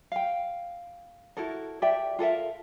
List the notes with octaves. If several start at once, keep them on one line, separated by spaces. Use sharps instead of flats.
F5 G5
E4 F#4 A4 A#4
G4 D5 E5 G5
F4 A4 A#4 E5